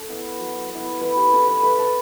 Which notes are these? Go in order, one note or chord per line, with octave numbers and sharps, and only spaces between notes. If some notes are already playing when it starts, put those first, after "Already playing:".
Already playing: C#4 A4
B3 E4
F#3
B3 E4
A3 B4
G4
C#4 E4 A4
B4
A3 B4
A4